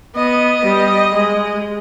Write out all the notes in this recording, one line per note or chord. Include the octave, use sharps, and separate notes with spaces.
B3 D#5
G3
G#3